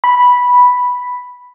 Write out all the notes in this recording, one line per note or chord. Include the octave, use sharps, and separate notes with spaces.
B5